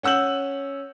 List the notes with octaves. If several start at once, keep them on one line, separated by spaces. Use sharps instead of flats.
C#4 F#5 E6 G6 F#7